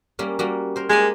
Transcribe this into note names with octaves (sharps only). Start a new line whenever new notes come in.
G3 A#3 C#4
G3 A#3 F#4
A#4 C5
G#3 A#3 G4 G#5